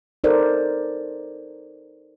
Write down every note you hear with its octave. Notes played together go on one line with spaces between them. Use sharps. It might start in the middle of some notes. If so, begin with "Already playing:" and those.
D#4 A4 A#4 C5 D5